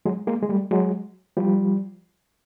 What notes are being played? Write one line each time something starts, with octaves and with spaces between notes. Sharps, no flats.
F#3 G#3
G#3 A#3
G#3
G3 A3
F#3 G#3
F3 G3